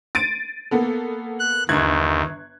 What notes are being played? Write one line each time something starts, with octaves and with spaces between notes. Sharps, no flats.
A6 D7 D#7
A#3 B3 A4
F#6
G1 D#2 F#6 G#6